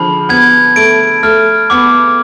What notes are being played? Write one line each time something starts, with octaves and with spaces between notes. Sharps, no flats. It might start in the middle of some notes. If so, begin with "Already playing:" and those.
Already playing: D3 F3 G#3 B5
B3 G#6
A3 D7
A3 F6
B3 D6